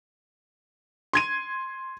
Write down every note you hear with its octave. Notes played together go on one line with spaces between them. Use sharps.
C6 G#6 D#7